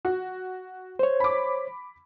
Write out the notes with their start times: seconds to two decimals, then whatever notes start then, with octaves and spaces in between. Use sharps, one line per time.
0.05 F#4
0.99 C5 C#5
1.20 B5 D6